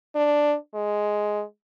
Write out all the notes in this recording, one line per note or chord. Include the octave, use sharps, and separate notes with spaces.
D4
G#3